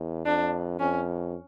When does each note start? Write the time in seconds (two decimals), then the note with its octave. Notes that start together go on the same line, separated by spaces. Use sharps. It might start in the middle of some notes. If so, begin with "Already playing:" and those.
Already playing: E2
0.26 F2 D4
0.80 F2 C#4